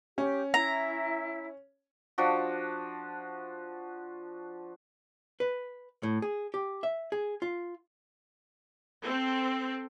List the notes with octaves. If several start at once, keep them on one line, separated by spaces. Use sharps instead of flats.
C#4 G4
E4 A#5
F3 D4 F#4
B4
A2
G#4
G4
E5
G#4
F4
C4 A4